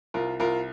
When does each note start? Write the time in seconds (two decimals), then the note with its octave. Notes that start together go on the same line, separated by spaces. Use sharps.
0.14 C2 F4 A#4
0.40 C2 F4 A#4